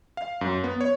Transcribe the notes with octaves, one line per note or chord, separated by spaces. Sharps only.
F5
F#2
B3
C#5